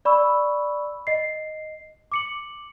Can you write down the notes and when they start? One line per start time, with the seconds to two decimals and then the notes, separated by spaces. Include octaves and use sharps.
0.05 D5 B5 C#6 E6
1.07 D#5 C7
2.12 D6 C#7 F#7